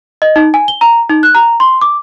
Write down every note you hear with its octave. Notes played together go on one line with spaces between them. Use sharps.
D#5
D#4
G#5
G7
A#5
D#4
F#6
A#5
C6
D6